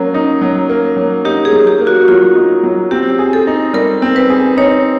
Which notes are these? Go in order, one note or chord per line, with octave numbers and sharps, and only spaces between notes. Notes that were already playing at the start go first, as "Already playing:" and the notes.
Already playing: F#3 A#3 C#4
D#4
F#3
A#3
F#3
D#4 G4
G#4
F#3
G4
A#3
F#4
F#3 F4
D#4
F#3
C4 G4
G#4
A4
D#4
G3 A#4
C4
B4
G#4
D#4 C#5